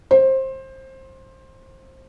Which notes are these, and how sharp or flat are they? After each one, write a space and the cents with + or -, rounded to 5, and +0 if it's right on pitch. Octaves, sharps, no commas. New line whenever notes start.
C5 +20